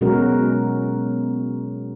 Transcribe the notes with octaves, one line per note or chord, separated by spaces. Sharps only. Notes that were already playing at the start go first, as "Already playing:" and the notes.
B2 F#3 G#3 C#4 F#4 A#4